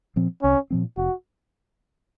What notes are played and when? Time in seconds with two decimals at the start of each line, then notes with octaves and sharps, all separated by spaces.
0.16 A#2 F3 C4
0.43 C2 C#4
0.71 A#2 F3 C4
0.97 F1 F#4